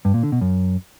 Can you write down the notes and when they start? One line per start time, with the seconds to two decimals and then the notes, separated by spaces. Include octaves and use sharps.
0.05 G2
0.14 A#2
0.23 D3
0.32 B2
0.41 F#2